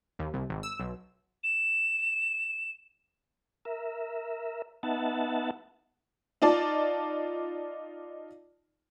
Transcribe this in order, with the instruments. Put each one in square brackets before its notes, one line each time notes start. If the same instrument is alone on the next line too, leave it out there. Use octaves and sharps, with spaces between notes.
[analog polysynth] D#2
C2
G#1
E6
B1
[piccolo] E7
[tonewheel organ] A#4 E5
B3 D#4 E5 F#5 A5
[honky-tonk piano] D#4 F4 D5 A5